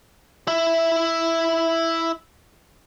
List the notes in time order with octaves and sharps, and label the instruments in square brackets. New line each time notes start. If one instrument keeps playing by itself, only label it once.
[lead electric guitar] E4 E5